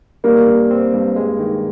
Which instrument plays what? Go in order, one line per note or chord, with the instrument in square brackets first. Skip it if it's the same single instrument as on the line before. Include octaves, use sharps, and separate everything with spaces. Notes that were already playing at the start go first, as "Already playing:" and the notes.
[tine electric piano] G3 [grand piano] A#3
[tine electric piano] G2
C4
G2
G#3
D#3